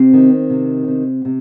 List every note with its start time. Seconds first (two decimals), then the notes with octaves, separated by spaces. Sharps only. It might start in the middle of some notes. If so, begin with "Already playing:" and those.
Already playing: C3 C4
0.13 D#3
0.50 C3
0.88 C3
1.25 C3